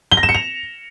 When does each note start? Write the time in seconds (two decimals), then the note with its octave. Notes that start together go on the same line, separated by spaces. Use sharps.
0.12 G7
0.17 A#6
0.23 E7
0.29 C#7
0.35 F7